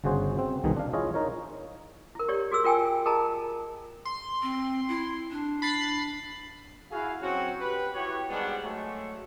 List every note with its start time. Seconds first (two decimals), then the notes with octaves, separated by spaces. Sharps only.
0.04 G1 C#3 F#4 G#4 C5
0.39 C4
0.64 C2 B2 D#3 G#4
0.76 D4 F5
0.93 E4 F4 G#4 C#5 D#5
1.14 D#4 A#4 C#5
2.15 E4 A#4
2.28 G4 C#5 D5
2.51 F#4 G#4 A#4 E6
2.64 F4 A#4 G5 G#5
3.06 G#4 A#4 D#5 A5 A#5
4.05 C6
4.42 C4
4.89 E4
5.31 D4
5.62 B5 A6 C7
6.91 E4 F#4 G#4 F5
7.21 F#3 C4 C#4 F#4
7.60 G4 B4
7.94 E4 F#4 G4 B4 C#5
8.29 G#2 G3 G#3 B3 D4
8.63 F#3 G#3 A3